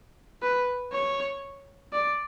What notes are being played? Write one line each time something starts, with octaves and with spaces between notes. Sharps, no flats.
B4
C#5
D5